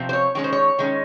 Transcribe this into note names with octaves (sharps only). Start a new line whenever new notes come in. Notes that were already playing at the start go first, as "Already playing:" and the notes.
Already playing: C3 F3 C4
C5
C#5
D#3 G#3 C#4 C#5
C5
C#5
D#3 G#3 C#4